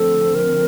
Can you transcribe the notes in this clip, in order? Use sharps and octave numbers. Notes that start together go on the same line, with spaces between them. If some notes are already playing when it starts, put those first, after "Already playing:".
Already playing: D3 F3 A3 C4 A4
A#4